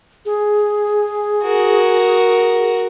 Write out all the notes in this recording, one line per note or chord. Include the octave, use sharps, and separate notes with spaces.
G#4
F#4 A#4